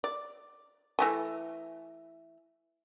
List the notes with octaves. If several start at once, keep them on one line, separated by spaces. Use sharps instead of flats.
D5
E3 A3 G#5